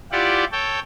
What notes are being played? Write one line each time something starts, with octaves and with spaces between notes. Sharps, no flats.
E4 F4 G4 D5 F#5
A4 C#5 G5